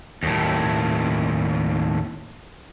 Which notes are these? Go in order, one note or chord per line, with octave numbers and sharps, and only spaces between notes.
D#2 A2